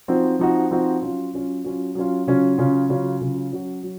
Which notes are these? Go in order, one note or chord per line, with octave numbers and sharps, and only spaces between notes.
F3 C4 D#4 F#4
F3 C4 D#4 F#4
F3 C4 D#4 F#4
F#3 C#4 F4
F#3 C#4 F4
F#3 C#4 F4
F#3 C#4 F4
C#3 F#3 C#4 F4
C#3 F#3 C#4 F4
C#3 F#3 C#4 F4
C#3 F#3 C#4 F4
F#3 C#4 F#4
F#3